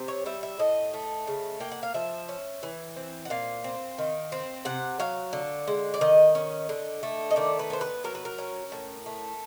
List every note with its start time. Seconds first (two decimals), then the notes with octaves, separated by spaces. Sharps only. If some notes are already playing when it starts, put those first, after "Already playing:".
Already playing: C3 C4
0.08 C#5
0.26 G3 E5
0.43 E5
0.59 A2 D#5
0.94 A3
1.27 C#3
1.60 A#3 G5
1.72 F#5
1.83 F5
1.94 F3 E5
2.29 C#4
2.63 E3
2.96 C4
3.25 F#5
3.30 A#2 F5
3.64 C4
3.98 D#3
4.32 C4
4.65 C3 F#5
5.00 F#3 F5
5.33 D3
5.68 G#3
5.94 D5
6.01 D#3 D#5
6.35 C#4
6.69 D3
7.03 A3
7.31 D#5
7.36 D#3 D5
7.59 B4
7.70 B3 C5
7.81 B4
8.04 F#3 A#4
8.15 B4
8.25 A#4
8.38 C#4
8.72 A2
9.06 A3